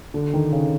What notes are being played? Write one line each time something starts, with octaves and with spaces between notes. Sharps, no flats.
D3
D#3
C#3